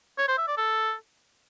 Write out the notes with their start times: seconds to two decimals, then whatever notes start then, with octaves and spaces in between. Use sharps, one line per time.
0.18 C#5
0.28 C5
0.38 E5
0.48 D5
0.58 A4